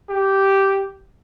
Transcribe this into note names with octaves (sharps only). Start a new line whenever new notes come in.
G4